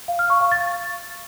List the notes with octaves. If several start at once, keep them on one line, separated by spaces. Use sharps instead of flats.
F5
F6
C#6
F5
A6